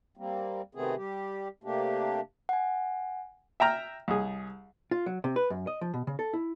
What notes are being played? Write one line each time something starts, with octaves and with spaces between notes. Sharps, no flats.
G3 A#3 C4
C3 D#3 A3 B3 C4 G#4
G3 G4
C3 A3 A#3 D4 G4
F#5 G#5
E5 G5 A#5 F6
C2 G#4
F4
F#3
C3
B4
F#2
D#5
F3
B2
C#3
A4
E4